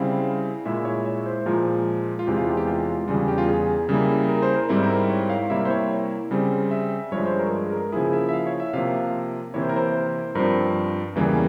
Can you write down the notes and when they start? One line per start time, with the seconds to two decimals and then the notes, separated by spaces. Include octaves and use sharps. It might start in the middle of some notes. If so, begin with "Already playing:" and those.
Already playing: C#3 G3 C4 E4 F5
0.65 A#2 G#3 E4 E5
0.85 C#5
1.05 E5
1.26 C5
1.46 A#2 F3 G#3 A#4
2.19 F4
2.27 E2 C3 E3 G#3 G4
2.37 F4
2.47 G4
2.57 G4
2.67 F4
3.07 E2 C#3 G3 F4
3.28 G4
3.38 F4
3.48 G#4
3.89 C#3 G3 A#3 E4
4.29 A#4
4.42 C5
4.56 A#4
4.69 G#2 G3 C4 E4 C5
4.83 A#4
5.10 C#5
5.30 F5
5.50 C3 G3 A#3 E4 E5
5.65 C5
5.70 C#5
6.31 C#3 G3 C4
6.71 E5
7.12 G2 F3 G#3 C#5
7.25 C5
7.39 A#4
7.52 G#4
7.72 A#4
7.92 C#3 F3 A#3 E4 G#4
8.13 E5
8.29 E5
8.33 F5
8.47 C#5
8.60 E5
8.73 C3 F3 A#3 F5
9.54 C3 E3 A#3 E4 C#5
9.62 C5
9.69 A#4
9.76 C5
10.35 G2 F3 C4 A#4
11.15 E2 C#3 E3 G3 A#3